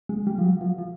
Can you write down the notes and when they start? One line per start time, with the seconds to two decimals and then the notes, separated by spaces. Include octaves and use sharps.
0.09 G#3
0.27 G3
0.38 F3
0.44 F#3
0.61 F3
0.78 F3